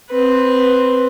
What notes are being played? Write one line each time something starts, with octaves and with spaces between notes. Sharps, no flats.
C4 B4